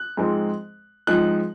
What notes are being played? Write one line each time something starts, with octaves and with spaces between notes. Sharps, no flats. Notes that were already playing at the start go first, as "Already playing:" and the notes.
Already playing: F#6
G#2 F3 G#3 C4 D#4
G#2 F3 G#3 C4 D#4 F#6